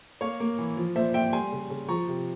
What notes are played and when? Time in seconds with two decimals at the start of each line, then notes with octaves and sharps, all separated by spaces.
0.21 A#3 C#5 F5
0.40 A#3
0.58 E3
0.77 F3
0.96 A#2 C5 E5
1.14 A#2 E5 G5
1.33 G3 G#5 C6
1.52 C#3
1.70 C#3
1.88 F3 A#5 C#6
2.08 C3